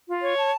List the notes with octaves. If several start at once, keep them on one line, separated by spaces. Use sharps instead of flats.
F4
C#5
A5